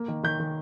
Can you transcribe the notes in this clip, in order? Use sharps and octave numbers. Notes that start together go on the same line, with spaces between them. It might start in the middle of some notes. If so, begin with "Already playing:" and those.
Already playing: A#3
D#3
D#3 G6
D#3